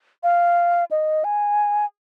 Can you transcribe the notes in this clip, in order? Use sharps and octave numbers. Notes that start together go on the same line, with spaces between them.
F5
D#5
G#5